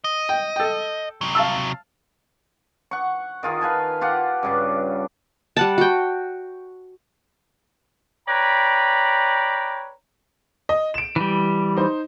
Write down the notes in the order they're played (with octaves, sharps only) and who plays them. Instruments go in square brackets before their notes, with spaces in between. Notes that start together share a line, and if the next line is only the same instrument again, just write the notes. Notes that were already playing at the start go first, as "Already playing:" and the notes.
[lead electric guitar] D#5
[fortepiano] G5
A4 G5
[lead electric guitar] C3 F#3
[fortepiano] F5 A5 E6
[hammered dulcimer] F#5 C#6
D#3 F4 G#4
B4 F5 G#5 A5
F4 G4 F5 F#5
G2 C#3 D4
[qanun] G3 F#5 A5
F#4 G5
[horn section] B4 C#5 D5 G5 A#5 B5
[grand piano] D#5
D7 E7
[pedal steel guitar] E3 G3
[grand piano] D#4 C5